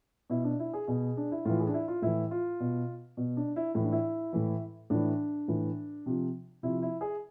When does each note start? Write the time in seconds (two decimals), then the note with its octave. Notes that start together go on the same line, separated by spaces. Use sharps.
0.30 B2 E4
0.44 D4
0.59 E4
0.73 G#4
0.87 B2 G#4
1.17 D4
1.32 E4
1.45 A2 E3 F4
1.60 G#4
1.67 D4
1.74 E4
1.88 F4
2.02 A2 E3 E4
2.31 F4
2.60 B2
3.17 B2
3.37 D4
3.56 E4
3.75 A2 E3 E4
3.83 D4
3.92 E4
4.33 A2 E3
4.90 A2 E3 D4
5.48 A2 E3
6.06 C3 F3
6.63 C3 F3 E4
6.82 E4
7.01 G#4